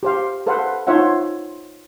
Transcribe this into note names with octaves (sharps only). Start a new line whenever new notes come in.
G4 C5 F5
A4 B4 C5 F5 F#5
D#4 F4 C5 C#5 E5 F#5